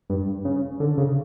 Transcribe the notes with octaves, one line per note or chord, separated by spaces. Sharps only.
G2
C#3
D3
C#3